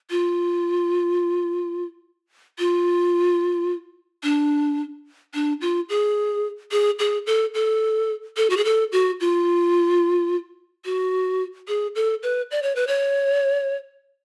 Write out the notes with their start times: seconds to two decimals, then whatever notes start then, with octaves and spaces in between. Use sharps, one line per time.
0.10 F4
2.59 F4
4.23 D4
5.34 D4
5.61 F4
5.89 G#4
6.71 G#4
6.99 G#4
7.27 A4
7.54 A4
8.37 A4
8.50 F#4
8.57 G#4
8.65 A4
8.92 F#4
9.20 F4
10.85 F#4
11.68 G#4
11.95 A4
12.23 B4
12.51 D5
12.62 C#5
12.76 B4
12.87 C#5